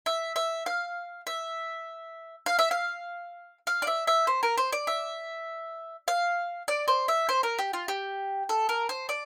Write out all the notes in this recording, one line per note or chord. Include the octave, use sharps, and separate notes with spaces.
E5
E5
F5
E5
F5
E5
F5
F5
D5
E5
E5
C5
A#4
C5
D5
E5
F5
D5
C5
E5
C5
A#4
G4
F4
G4
A4
A#4
C5
D5